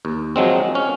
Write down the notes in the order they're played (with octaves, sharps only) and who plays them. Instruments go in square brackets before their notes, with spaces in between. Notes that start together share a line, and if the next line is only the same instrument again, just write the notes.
[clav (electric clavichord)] D#2
F3 F#3 G#3 C4
C#4